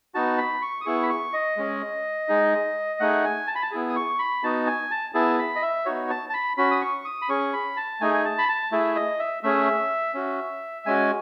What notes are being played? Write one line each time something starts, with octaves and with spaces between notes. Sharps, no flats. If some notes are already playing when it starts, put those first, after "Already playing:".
B3 D#4 F#4 A5
B5
C#6
D#6
B3 E4 G#4 C#6
B5
C#6
D#5
G#3 C#4 G#4
G#3 D#4 G#4
A3 D#4 G#4 F#5
G#5
A5
B5
A5
B3 E4 G#4
D#6
C#6
B5
B3 D#4 F#4 A5
G#5
A5
B3 E4 G#4 A5
B5
D#5
E5
B3 D#4 F#4 C#5
A5
A5
B5
C#4 F#4 B5
D#6
C#6
D#6
B5
C#4 G#4 C#6
B5
A5
A3 D#4 G#4 G#5
G#5
A5
B5
A5
A3 E4 G#4 E5
D#5
E5
A3 C#4 G#4 E5
C#4 F#4
G#3 C#4 F#4 G#5